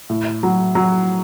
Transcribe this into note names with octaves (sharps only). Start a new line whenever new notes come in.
A2
F#3
F#3